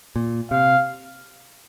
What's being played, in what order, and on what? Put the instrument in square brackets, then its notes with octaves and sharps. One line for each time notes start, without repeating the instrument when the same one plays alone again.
[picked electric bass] A#2
[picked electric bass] C3 [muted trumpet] F5